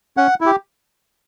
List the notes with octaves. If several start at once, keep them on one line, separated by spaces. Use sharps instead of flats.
C#4 F#5
E4
G4